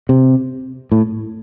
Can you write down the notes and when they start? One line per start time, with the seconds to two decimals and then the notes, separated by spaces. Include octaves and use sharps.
0.09 C3
0.92 A2